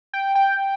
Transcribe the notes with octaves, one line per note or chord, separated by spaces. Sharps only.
G5
G5